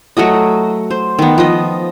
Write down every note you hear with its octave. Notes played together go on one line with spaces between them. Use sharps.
F#3 A3 F#4 D#5
C5
D#3 B3
F3 D#5